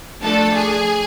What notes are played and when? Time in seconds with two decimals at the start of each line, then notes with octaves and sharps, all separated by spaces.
0.22 F3 A3 D4 A4 A5
0.55 G#4 G#5